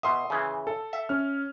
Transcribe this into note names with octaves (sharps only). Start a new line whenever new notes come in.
B2 E5 C6 D#6
C#3 E3
A4
E5
C#4 F6